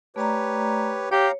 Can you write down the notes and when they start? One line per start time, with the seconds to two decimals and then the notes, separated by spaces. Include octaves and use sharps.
0.16 A3 G4 B4 C#5 D5 A#5
1.12 G4 C#5 F5 A#5